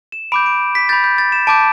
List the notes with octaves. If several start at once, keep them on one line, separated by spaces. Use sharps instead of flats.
E7
B5 D6 G6 D7
D7
B6
B5 G6 A6
G6
A6
E7
A5 D6 G6 D7